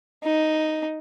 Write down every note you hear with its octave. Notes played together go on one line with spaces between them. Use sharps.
D#4